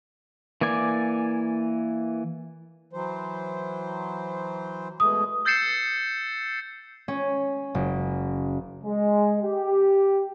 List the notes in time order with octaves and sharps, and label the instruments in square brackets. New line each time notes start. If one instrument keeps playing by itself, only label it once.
[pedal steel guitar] E3 A#3 D5 G#5 D6
[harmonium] E3 F#3 C5
[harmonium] B2 G#3 A3 [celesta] D#6
[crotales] E6 G6 A6 C7 C#7 E7
[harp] C#4
F#1
[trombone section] G#3
G4